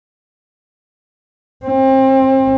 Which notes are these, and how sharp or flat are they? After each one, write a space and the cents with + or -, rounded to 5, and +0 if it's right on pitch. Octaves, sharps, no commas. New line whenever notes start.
C4 +30